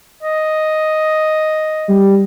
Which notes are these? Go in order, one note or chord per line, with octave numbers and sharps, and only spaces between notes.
D#5
G3